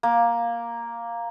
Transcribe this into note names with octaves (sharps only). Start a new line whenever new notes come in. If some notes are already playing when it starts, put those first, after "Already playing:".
A#3